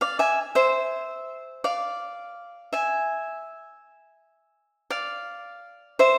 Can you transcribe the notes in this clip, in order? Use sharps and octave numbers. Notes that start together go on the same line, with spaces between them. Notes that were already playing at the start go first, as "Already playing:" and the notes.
D5 F5
E5 G#5
C5 E5
D5 F5
E5 G#5
D5 F5
C5 E5